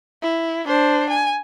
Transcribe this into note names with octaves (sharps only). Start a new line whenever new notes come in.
E4
D4 C5
G#5